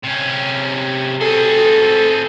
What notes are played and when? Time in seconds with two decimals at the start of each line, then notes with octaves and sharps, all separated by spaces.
0.03 C3 C#4
1.21 C4 G#4 A4